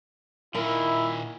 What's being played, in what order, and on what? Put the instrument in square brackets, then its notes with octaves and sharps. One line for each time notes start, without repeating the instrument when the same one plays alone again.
[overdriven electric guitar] A#2 D#3 [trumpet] E4 [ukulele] A#4